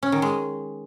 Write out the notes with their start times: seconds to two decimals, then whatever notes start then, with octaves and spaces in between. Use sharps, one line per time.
0.03 C#4
0.12 D#3
0.22 G#3